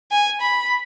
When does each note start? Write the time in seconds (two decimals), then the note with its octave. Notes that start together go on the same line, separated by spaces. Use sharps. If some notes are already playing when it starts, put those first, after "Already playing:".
0.11 G#5
0.41 B5